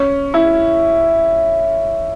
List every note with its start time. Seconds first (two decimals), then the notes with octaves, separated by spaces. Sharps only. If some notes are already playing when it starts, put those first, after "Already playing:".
Already playing: C#4
0.34 E4